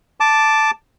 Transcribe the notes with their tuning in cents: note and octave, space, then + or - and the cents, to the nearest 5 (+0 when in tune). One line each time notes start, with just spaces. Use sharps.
A5 +0 D6 +0